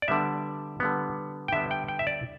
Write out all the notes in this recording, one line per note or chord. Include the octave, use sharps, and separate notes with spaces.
D5
D3 G3 B3 E5
D3 G3 B3
G5
D3 G3 B3 E5
G5
G5
E5
D5